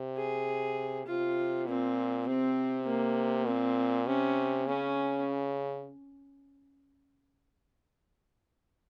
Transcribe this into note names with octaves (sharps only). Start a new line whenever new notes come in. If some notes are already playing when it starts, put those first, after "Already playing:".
Already playing: C3
G#4
C3 F4
A#2 C4
C3 C4
A#3
A#2 C4
C3 C#4
C#3 C#4